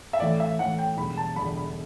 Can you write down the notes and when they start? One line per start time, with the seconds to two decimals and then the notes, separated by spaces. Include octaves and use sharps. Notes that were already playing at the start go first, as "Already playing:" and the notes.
0.13 E5
0.20 A2 E3 A3 C#4 D5
0.40 E5
0.58 A2 E3 A3 C#4 F#5
0.78 G5
0.97 E1 E2 D3 G3 B5
1.17 A5
1.36 E1 E2 D3 G3 B5
1.57 B5